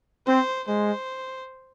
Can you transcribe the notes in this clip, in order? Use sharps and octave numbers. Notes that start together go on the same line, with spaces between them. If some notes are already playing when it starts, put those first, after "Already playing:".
C4 C5
G#3 C5